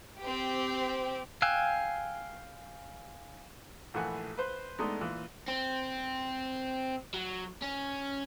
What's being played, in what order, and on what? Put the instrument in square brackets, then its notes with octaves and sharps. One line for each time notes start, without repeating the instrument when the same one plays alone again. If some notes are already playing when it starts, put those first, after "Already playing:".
[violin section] C4 G4
[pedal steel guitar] F5 G5 G#5 E6 F#6
[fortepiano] A#1 E3 A3 F#5 G#5
B4 C5
G#3 A3 B3 D4 D#4
A#2 E3
[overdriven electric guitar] C4
F#3
C#4